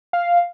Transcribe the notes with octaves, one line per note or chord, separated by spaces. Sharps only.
F5